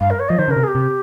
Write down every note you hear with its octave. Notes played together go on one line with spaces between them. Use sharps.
G2 F5
A#4
C#5
F3 D#5
D#3 C5
C#3 A#4
C3
G#4
G4
C3